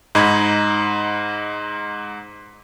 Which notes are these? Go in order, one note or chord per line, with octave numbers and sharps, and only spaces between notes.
G#2 D#4 B5 G#6